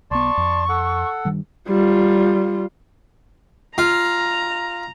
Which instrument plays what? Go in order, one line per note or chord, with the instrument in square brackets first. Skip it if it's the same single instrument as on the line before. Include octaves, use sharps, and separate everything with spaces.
[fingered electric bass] B1 B3 [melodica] D5 A5 C6 [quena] C#6
[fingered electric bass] F2
[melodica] A4 F#5
[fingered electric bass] G2 D#3 G3
[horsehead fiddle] G3 F4
[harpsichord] F4 [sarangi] A#5